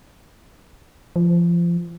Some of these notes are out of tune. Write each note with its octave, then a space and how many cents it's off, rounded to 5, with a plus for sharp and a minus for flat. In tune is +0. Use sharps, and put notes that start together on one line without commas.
F3 -25